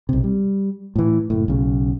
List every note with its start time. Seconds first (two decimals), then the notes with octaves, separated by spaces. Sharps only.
0.09 B1 C3
0.24 G3
0.96 A2 E3
1.30 F#1 A2
1.48 B1 C#3